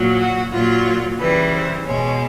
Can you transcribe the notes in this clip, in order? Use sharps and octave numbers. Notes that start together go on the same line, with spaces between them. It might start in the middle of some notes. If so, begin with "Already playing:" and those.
Already playing: A#2 F#3
F#4
A#2 F#3 F4
C#3 E3 G3 B4
C5
B2 G#3 C#5